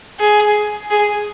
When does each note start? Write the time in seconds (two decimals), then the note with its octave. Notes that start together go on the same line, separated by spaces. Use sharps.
0.20 G#4
0.90 G#4